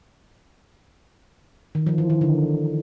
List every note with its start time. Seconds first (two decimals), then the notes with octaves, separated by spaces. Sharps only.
1.75 D#3
1.87 F3
1.98 E3
2.10 D#3
2.21 D3